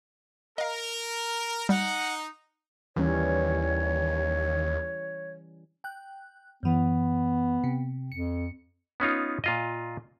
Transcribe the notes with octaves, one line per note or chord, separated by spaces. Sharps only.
A#4 D#5 F5
G3 D#4 F#5
D#2 E3 G3 C#4 C#5
G5 F#6
F#2 E3 B3
C3
F2 C#7
B3 C#4 D#4 F4
A#2 F4 D#5